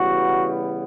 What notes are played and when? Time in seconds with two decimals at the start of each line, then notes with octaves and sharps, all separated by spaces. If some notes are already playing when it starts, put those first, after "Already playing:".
Already playing: C#3 E3 G3 B3 F#4